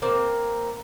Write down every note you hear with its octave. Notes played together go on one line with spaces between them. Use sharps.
A#3 C4